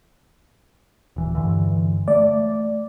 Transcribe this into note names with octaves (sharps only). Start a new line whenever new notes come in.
D#1 E3
G2 D3 E3
A3 D5